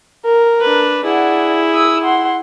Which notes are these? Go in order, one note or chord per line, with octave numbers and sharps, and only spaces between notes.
A#4
D4 B4
E4 G#4 D5 F#5
D#6 E6
F#5 C6